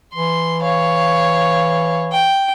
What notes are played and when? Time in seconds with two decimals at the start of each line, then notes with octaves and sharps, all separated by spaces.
0.14 E3 C6
0.63 C#5 F5
2.12 G5